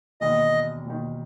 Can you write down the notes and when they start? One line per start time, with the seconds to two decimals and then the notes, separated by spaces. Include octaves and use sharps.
0.21 E1 D#2 D#3 D#5
0.86 E1 D#2 D#3